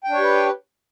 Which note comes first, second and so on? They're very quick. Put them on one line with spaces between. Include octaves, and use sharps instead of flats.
G5 D4 C#5 G4 B4